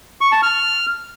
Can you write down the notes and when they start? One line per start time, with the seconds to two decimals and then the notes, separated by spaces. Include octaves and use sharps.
0.21 C#6
0.32 A5
0.43 F6